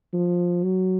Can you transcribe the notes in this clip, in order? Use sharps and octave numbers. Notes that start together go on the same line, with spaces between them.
F3
F#3